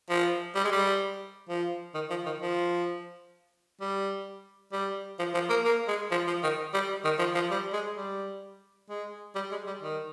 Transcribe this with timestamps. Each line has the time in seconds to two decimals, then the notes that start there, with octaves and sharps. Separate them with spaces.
0.09 F3
0.55 G3
0.64 G#3
0.72 G3
1.49 F3
1.94 D#3
2.10 F3
2.26 D#3
2.41 F3
3.80 G3
4.72 G3
5.19 F3
5.34 F3
5.49 A#3
5.64 A#3
5.88 G#3
6.11 F3
6.27 F3
6.43 D#3
6.74 G3
7.04 D#3
7.19 F3
7.35 F3
7.51 G3
7.73 G#3
7.97 G3
8.90 G#3
9.35 G3
9.51 G#3
9.67 G3
9.82 D#3